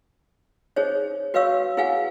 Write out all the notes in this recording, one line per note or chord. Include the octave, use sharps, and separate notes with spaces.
D#4 G#4 C5 C#5
F#4 B4 C#5 F5 C#6 E6
E4 G#4 B4 F5 F#5 G#5